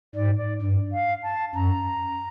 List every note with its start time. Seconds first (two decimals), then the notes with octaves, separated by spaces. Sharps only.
0.15 G#2 D5
0.37 D5
0.61 G2
0.92 F5
1.23 A5
1.55 F#2 A#5